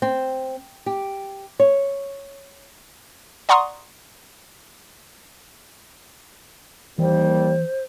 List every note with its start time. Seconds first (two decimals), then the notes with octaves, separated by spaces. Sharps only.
0.02 C4
0.86 G4
1.60 C#5
3.49 D5 F#5 A#5 C6 C#6 D#6
6.98 D#2 E3 G3 C5